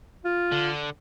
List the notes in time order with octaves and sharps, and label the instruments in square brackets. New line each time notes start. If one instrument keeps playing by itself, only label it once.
[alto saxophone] F4
[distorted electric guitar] D3